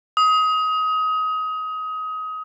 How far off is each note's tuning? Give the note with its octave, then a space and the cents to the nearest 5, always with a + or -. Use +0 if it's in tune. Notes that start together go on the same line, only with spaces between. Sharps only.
D#6 +25